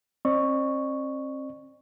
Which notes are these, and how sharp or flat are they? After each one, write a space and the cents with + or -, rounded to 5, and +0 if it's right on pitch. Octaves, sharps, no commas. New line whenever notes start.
C4 +40 D5 +40 C#6 +0